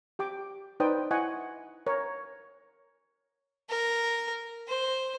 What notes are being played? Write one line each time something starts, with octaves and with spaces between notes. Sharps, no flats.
G4 G5 D6
D#4 B4 C5 D5 G5 D#6
E4 D#5 F#5 G#5 C#6
A#4 C#5
A#4
C5